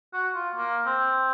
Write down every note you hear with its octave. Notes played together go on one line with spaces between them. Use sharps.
F#4
F4
A#3
C4